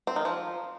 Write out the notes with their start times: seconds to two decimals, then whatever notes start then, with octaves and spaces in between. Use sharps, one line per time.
0.07 C4
0.16 D#3
0.25 F3